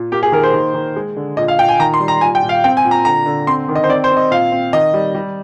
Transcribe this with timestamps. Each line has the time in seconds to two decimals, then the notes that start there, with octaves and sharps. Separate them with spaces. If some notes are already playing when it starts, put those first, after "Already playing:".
Already playing: A#2
0.12 A#3 G4
0.23 G#4
0.32 D#3 A#4
0.43 C5
0.54 D#3
0.74 D#3
0.96 G#3
1.16 D3
1.37 A#2 D#5
1.48 F5
1.58 A#2 G5
1.69 G#5
1.79 D#3 A#5
1.94 C6
2.00 G3
2.08 A#5
2.21 A#2 G#5
2.35 G5
2.43 A#2
2.49 F5
2.64 C4 G5
2.77 G#5
2.85 A#2
2.91 A#5
3.05 D3 A#5
3.26 D3
3.47 C4 C6
3.69 D#3
3.75 D#5
3.84 C5
3.89 C4 D5
4.04 C5
4.11 C4
4.17 D#5
4.31 A#2 F5
4.52 C4
4.73 D#3 D#5
4.94 G3
5.15 G3